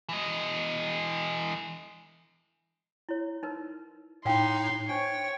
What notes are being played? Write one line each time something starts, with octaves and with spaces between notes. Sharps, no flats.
E3 D#5
E4 C#5
D#4 A#4 B4
A2 D#4 A#4 F5 G5 C6
D4 C5 C#5 G5